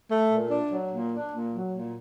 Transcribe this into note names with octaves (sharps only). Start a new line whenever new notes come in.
A3
A#2
D4
F#3
A#2
D4
A#2
F#3
A#2